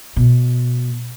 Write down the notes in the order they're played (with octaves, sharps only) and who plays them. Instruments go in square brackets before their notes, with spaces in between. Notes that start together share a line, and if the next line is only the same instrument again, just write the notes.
[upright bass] B2